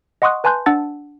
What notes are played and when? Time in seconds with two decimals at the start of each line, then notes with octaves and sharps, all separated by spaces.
0.22 D#5 F#5 C6 C#6 D#6 F#6
0.44 B4 G#5 A5 C6 F#6 G6
0.66 D4 F#5 A5 E6 A6